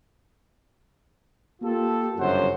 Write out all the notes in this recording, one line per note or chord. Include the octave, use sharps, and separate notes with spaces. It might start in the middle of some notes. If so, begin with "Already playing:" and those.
A#3 F4 G4 A4
G1 F#2 C#3 C5 F#5